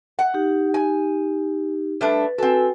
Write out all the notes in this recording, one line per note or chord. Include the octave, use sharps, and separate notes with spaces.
F#5
D#4 G4
G#5
G3 A3 D4 B4
C4 F#4 A4 B4 G#5